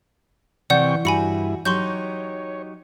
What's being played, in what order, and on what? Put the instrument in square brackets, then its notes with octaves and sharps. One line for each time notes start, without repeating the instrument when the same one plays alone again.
[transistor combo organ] C3 G5 C#6 [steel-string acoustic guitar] E3 [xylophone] D5 F#5 G6
[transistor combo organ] G2 E4 [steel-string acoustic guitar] F#4 [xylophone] G#5 B5 C#7
[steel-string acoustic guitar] F#3 D#4 G4 [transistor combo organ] C#5 [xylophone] C6 C#6 G6